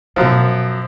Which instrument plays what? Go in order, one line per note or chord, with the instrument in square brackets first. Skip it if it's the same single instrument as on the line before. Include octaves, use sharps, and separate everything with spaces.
[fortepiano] F#2 F3 [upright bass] B2 F4